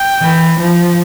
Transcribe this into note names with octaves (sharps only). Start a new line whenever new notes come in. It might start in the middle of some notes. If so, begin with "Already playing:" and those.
Already playing: G5
E3
F3